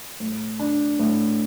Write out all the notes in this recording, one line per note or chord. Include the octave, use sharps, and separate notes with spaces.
A2
D4
A2